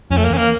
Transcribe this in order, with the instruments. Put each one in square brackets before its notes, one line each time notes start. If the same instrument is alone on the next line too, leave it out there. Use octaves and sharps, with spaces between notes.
[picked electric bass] F2 [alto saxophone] C#4
[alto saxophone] A3
A#3
[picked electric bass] E2
[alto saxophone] C#4
A#3